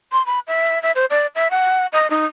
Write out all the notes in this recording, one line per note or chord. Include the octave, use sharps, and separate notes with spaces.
C6
B5
E5
E5
C5
D5
E5
F#5
D#5
D#4